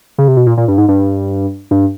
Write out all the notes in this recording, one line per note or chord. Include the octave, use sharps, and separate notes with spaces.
C#3
C3
B2
A#2
A#2
G2
G#2
G2
G2